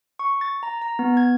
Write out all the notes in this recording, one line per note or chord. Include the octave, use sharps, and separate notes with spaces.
C#6
A6
A#5
A#5
B3
G#6